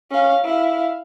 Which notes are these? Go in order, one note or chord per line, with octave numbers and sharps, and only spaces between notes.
C#4 F5
E4 F5